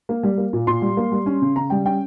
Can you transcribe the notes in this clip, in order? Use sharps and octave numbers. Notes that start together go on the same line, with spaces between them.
A#3
G3
A#3
A#2
A#2 C6
G3
A#3
G3
C#4
C#3
C#3 A#5
G3 G5
C#4 G5